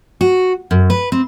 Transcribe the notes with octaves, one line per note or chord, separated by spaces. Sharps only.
F#4
F#2
B4
C4